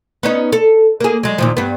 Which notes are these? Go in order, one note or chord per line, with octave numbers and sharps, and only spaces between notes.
B3 C#4 D#4
A4
A#3 G#4
F#3 G#3
D#2 A#2 F3
G2 B3